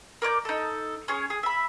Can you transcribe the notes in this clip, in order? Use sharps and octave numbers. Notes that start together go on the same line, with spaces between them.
A#4 D5 D6 G6
D#4 A4
C#4 G#4 C#5
G#4
E5 B5